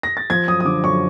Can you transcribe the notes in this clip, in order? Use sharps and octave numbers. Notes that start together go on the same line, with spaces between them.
A#6
A6
F3 G#6
F#2 D#6
D#6
D3 D6
F#2 C#6